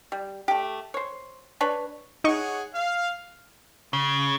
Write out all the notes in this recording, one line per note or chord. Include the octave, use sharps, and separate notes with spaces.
G3
A3 G4
C5 C#5
D4 B4 C#5
D#4 G#4 C#5 D#5 F#5 C#6
F5
C#3